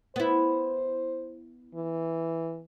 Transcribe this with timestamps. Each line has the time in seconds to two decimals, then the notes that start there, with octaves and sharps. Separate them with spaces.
0.16 B3 E4 C5
1.75 E3